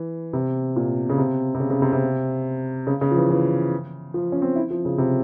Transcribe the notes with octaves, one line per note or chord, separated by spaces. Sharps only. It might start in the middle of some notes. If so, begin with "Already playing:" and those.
Already playing: E3
C3
A#2
C#3
C3
C3
C#3
C#3
C3
C3
C#3
C#3
F3
E3
E3
F3
C#4
C4
E4
F3
C#3
C3